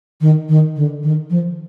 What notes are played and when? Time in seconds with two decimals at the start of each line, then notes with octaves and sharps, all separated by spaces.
0.21 D#3
0.49 D#3
0.76 D3
1.03 D#3
1.30 F3